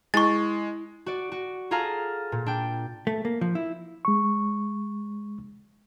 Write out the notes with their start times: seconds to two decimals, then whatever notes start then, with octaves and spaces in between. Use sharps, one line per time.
0.14 G#3 E4 G#5 C#6 A6
1.06 F#4 D5
1.32 F#4
1.71 F4 G#4 A4 F5 A#5
2.32 A#2
2.46 D4 G5
3.07 A3
3.25 A#3
3.41 F3
3.55 E4
4.05 G#3 C#6